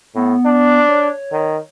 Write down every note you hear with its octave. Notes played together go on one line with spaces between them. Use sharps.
A2 B3
D4
C#5
D#3